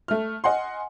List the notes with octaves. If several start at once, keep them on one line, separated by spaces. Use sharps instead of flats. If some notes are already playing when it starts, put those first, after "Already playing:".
A3 F6
D#5 F#5 G#5 C6